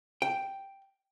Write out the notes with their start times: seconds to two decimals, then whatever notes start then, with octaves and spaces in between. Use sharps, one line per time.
0.22 G5